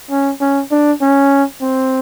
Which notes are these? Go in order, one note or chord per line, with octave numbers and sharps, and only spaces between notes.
C#4
C#4
D4
C#4
C4